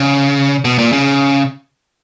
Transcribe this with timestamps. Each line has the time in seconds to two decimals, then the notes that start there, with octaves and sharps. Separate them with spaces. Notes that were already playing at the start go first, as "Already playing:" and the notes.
Already playing: C#3
0.65 B2
0.79 A#2
0.93 C#3